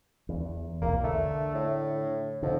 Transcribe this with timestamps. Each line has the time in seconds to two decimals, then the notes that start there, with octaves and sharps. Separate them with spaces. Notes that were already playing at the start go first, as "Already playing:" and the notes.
0.29 E2
0.82 B1 E2 A#3
1.04 D3 A3
1.55 A2
2.43 F2 D3